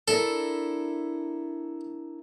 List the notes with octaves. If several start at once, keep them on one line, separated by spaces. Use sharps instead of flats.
D4 E4 A4 A#4